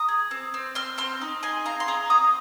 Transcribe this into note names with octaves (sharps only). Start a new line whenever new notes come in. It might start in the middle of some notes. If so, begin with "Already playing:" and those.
Already playing: A#5 D#6
G#4
C4
C4
C4 C6 F6
C4 C6 F6
D#4
G#4 G#5 C6
C4 F5 A#5
C6
G#4 A#5 D#6
C4 A#5 D#6